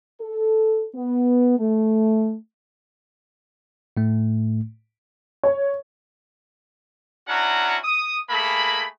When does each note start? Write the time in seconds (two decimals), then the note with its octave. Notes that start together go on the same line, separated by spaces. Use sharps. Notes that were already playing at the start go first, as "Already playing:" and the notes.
0.21 A4
0.94 B3
1.58 A3
3.97 A2 A3
5.44 C#5
7.28 C#4 D4 E4 F#4 F#5 A#5
7.84 D#6
8.30 A3 A#3 G#4 B5